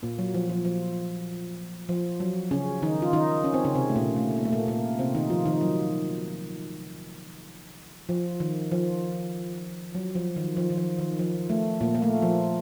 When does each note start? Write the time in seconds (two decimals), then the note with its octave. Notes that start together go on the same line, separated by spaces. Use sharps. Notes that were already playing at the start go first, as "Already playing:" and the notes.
0.03 A#2 A#3
0.19 F#3
0.34 F3
0.50 F3
0.65 F3
1.89 F3
2.20 F#3
2.51 C#3 C#4
2.82 D#3 D#4
3.02 F4
3.13 D#3 D#4
3.44 C#4
3.54 C4
3.64 C#3 C#4
3.75 C3 C4
3.89 A3
3.96 A#2 A#3
4.16 A3
4.37 A#3
4.45 A3
4.53 A#2 A#3
4.68 A#2 A#3
4.99 C3 C4
5.15 D#3 D#4
5.30 F3 F4
5.46 D#3 D#4
5.61 F#3
8.09 F3
8.40 D#3
8.72 F3
9.95 F#3
10.15 F3
10.36 D#3
10.57 F3
10.70 D#3
10.78 F3
10.99 D#3
11.19 F3
11.50 A3
11.81 A#2 A#3
11.95 A#3
12.02 A3
12.22 F3